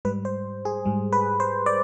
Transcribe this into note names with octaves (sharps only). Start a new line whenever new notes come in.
G#2 G3 B4
C5
G#4
G#2 G3
B4
C5
D5